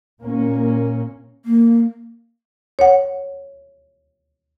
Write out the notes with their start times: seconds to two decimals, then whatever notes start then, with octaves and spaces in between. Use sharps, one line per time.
0.23 A#2 A#3 C#4
1.45 A#3
2.79 C#5 F#5